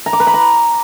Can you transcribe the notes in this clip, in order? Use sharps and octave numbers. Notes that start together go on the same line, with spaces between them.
A#5
D6
B4
B5
A#5